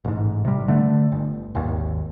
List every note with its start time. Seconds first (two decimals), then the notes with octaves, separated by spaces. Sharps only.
0.05 A1 G#2
0.45 C3 G3
0.68 D3 A3
1.12 G1
1.55 G#1 D#2